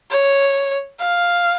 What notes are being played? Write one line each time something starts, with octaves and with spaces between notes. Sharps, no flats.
C#5
F5